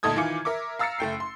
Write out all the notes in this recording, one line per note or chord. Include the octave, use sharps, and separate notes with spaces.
D2 A#2 D#4 A4 D#6 G#6
D#3 E3 F4 G#5 D6 C#7
A#4 E5 D6
F5 A#5 E6 A6 C7 C#7
F#1 A3 G5 C7
C6